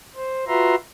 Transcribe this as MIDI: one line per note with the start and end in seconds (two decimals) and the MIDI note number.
0.16 0.45 72
0.48 0.75 65
0.48 0.75 66
0.48 0.75 71
0.48 0.75 76
0.48 0.75 82
0.48 0.75 84